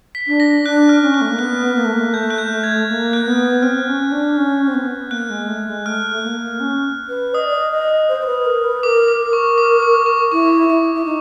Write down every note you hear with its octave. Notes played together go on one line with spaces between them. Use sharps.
B6
D4
A#6
D4 F#6
F6
C#4
F#6
A3
A#3
B3 F#6
A#3
A3
A#3
A3 G6
F#6
G6
A3
G#6
A#3
F#6
B3
C4 F6
C#4
D4
C#4
C4
B3
A#3 F#6
G#3
A3
G#3
A3 F6
A#3
C#4
B4
D#5 D#6
D5
D#5
D#5
C5
C5
B4
A#4
B4
A#4 D6
D6
A#4
C#6
D6
C#6
C#6
E4 C#6
E4
E4
D#4